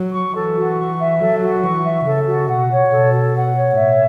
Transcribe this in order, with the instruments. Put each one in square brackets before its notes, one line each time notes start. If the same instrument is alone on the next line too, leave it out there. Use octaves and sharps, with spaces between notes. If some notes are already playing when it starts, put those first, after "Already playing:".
Already playing: [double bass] F#3
[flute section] C#6
[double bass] E3 [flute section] A4
[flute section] F#4
C#6
E5
[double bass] F#3 [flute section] A4
[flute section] F#4
[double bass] E3 [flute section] C#6
[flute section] E5
[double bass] C#3 [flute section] A4
[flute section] F#4
[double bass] B2 [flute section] F#5
[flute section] C#5
[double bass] B2 [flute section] A4
[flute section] F#4
F#5
C#5
[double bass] A2 [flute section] E5